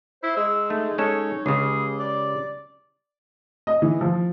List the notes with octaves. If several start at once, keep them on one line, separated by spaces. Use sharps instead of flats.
E4 C5
G#3 E6
A3 D#4
G#3 C#4 A4 C#5
C#2 C#3 G4 G#4
D5
D#5
E3
F3